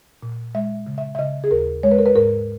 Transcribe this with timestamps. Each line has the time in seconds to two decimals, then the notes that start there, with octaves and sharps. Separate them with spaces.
0.23 A#2
0.55 G#3 E5
0.87 C#3
0.98 E5
1.15 E5
1.19 C#3 D#5
1.44 G#4
1.51 D#2 A#4
1.83 G#3 C#5
1.91 B4
1.98 A#4
2.06 B4
2.15 G#2 A#4